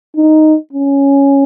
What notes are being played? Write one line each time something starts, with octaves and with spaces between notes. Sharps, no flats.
D#4
C#4